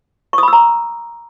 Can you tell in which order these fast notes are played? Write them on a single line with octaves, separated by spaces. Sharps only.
C#6 D#6 B5 E6 A#5